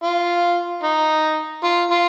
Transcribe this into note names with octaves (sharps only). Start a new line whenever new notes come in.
F4
D#4
F4
F4